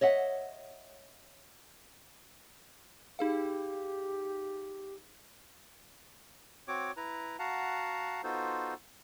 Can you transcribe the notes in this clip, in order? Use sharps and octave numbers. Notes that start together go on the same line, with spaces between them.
C#5 D#5 E5 F#5
D#4 G4 G#4 F5
C4 F#4 C#5 D6
E4 B4 A#5
F#4 F5 F#5 A5 A#5
B3 D#4 F4 F#4 A4 C5